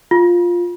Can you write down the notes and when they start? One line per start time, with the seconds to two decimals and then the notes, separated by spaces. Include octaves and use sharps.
0.11 F4